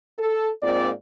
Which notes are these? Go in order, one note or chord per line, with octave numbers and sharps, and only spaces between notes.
A4
G#2 A#3 C4 F4 D5